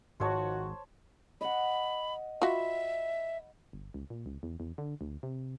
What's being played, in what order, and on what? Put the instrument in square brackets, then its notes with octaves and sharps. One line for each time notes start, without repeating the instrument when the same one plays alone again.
[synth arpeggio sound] G#1 G#2 D#3 [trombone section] F3 F#4 [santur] C5 C#5 A5
[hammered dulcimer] D#5 F#5 [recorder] B5
[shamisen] F4 F#4 [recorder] E5 [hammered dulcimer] B5
[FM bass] G1
C#2
A#2
C#2
E2
E2
D3
D2
C3